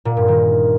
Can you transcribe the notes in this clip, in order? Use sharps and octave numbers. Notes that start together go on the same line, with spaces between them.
A#2
G2
D#3